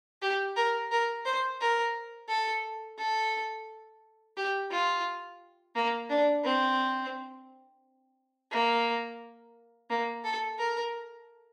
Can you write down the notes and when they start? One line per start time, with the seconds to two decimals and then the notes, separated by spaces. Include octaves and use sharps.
0.22 G4
0.56 A#4
0.91 A#4
1.25 C5
1.60 A#4
2.29 A4
2.98 A4
4.37 G4
4.71 F4
5.75 A#3
6.10 D4
6.44 C4
8.51 A#3
9.90 A#3
10.24 A4
10.58 A#4